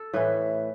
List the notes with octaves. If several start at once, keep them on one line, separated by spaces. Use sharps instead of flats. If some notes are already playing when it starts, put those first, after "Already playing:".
Already playing: A4
A2 E3 B4